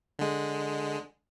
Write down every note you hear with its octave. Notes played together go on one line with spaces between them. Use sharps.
D3 G#3